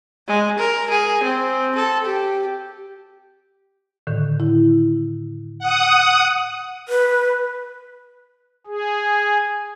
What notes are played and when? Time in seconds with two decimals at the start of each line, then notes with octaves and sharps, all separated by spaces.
0.28 G#3
0.58 A#4
0.90 G#4
1.23 C4
1.75 A4
2.05 G4
4.07 A2 D3 D#3
4.40 E4
5.59 F#5 D#6
6.89 B4
8.67 G#4